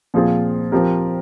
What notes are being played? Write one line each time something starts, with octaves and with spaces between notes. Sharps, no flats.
A#2 F3 C4 F4 G#4
F3 C4 G4 A#4